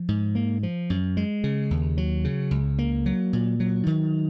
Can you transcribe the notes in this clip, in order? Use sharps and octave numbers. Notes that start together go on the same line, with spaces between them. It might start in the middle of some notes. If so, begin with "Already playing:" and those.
Already playing: F3
G#2
A#3
F3
F#2
G#3
C#3
D#2
F#3
C#3
C#2
A#3
F#3
A#2
F#3
D#3